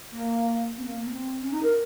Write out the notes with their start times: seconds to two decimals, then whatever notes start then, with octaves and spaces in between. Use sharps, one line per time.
0.11 A#3
0.77 C4
0.84 A#3
1.01 A#3
1.08 C4
1.41 C#4
1.52 D#4
1.63 A#4